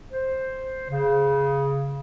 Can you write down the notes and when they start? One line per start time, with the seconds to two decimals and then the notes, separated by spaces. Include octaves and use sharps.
0.12 C5
0.89 C#3